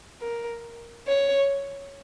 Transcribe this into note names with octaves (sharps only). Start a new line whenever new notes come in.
A#4
C#5